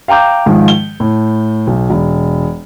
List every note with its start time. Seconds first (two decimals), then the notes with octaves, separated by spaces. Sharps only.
0.08 F5 G5 A#5 D6 G6
0.46 G#2 D#3 F3
0.68 G7
1.00 A2
1.67 B1
1.90 E1